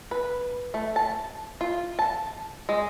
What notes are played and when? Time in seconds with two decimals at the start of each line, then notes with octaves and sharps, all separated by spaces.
0.11 B4
0.74 A3
0.96 A5
1.61 F4
1.99 A5
2.69 G#3